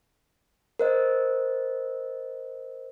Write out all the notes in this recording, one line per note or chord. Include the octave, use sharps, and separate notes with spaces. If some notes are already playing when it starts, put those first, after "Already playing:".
A#4 C5 D#5